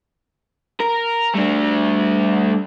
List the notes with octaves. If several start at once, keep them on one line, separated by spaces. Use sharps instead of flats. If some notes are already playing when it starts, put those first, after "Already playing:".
A#4
G3 A3 D4